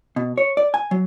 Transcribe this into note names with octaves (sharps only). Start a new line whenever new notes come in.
B2
C#5
D5
G#5
F#3